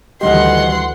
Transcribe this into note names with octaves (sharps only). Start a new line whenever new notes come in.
D2 D#3 E3 G3 G4 D#5 F#5 C6